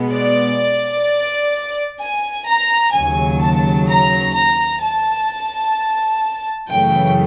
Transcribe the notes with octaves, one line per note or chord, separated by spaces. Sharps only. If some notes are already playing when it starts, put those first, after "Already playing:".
Already playing: B2 G#3 B3
D5
G#5
A#5
D#2 C#3 F#3 G#5
A5
A#5
A#5
A5
F#2 C#3 E3 A3 G5